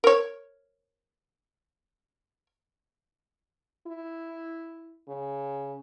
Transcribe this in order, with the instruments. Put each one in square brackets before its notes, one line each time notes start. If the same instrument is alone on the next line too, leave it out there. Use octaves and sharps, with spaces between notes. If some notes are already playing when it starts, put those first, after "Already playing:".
[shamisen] A#4 C#5
[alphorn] E4
C#3